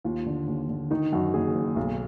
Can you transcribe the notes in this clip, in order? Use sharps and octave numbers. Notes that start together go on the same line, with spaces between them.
D#2 F4
D3
D#2
D3
D#3 D#4
F#2 F#4
F#1 G#4
F#1
B1